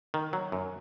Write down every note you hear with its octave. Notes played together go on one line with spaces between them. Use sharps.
D#3
F#3
F#2